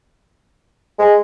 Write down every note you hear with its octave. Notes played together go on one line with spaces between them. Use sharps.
G#3